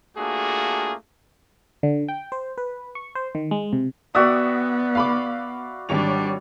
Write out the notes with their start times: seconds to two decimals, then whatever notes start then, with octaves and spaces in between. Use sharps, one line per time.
0.17 A3 A#3 D4 F4 F#4 G#4
1.83 D3
2.09 G5
2.32 C5
2.58 B4
2.95 C#6
3.15 C5
3.35 D#3
3.51 G#3
3.73 C3
4.15 B3 F#4 D5 E5 G5 D#6
4.95 F5 B5 D6
5.89 G#1 G3 D4 C#5 F7